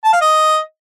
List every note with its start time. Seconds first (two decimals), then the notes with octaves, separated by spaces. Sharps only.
0.04 A5
0.13 F5
0.21 D#5